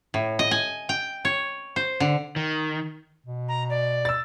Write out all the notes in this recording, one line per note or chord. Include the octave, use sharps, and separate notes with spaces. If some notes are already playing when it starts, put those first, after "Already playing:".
A2
D#5
G#5
G5
C#5
C5
D3
D#3
B2
A#5
D5
E6 A6